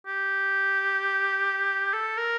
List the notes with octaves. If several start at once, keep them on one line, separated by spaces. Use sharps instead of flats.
G4
A4
A#4